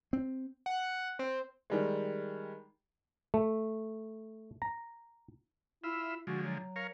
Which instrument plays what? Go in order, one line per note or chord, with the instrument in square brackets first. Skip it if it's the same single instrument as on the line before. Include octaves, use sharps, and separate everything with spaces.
[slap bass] C4
[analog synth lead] F#5
C4
[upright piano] D#3 G3 G#3
[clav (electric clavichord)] A3
A#5
[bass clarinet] E4 [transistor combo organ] F4 E5
[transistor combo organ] D3 F3 G#3 [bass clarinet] F#4
[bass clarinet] F#3
[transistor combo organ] A#4 C#5 F5